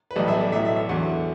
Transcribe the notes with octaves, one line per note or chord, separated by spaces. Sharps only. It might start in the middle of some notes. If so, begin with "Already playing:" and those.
B4
B1 A2 E3 G3 A4
E5
D5
B1 A2 F#3 E5
E5
E5
E2 D3 F#3 F#5